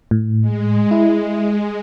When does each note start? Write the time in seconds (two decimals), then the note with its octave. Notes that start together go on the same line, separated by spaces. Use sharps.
0.11 A2
0.41 G#3
0.91 E4